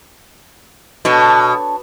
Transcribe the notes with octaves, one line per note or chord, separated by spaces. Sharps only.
B2 D4 A4 C#5